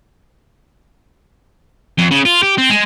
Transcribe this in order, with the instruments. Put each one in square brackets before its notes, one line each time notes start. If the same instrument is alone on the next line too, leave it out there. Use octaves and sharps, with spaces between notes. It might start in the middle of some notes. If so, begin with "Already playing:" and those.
[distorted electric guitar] F2
C#3
F4
G4
C4
G#3